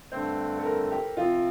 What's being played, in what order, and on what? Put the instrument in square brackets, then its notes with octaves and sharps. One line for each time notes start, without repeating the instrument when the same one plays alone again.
[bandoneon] G2 D3 A3 C4 [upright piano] C5
[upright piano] A4
A#4
G4
[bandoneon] C3 F3 C4 [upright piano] F4